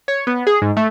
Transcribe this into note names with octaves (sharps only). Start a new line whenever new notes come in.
C#5
B3
G#4
G#2
A3